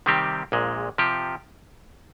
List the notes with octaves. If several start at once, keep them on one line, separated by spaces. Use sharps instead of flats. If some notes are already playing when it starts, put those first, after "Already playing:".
C3 D#3 G3 C4 G4
A#1 A#2 G#3
C3 F3 G4